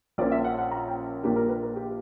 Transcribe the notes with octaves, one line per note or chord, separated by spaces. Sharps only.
A#1 A#2 A#3 C#4 D5
E5
F#5
F#5
A#5
G5
A#1 A#2 A#3 D4 G4
A#4
B4
A#4
G4